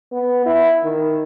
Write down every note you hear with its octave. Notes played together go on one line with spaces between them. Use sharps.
B3
E4
D#3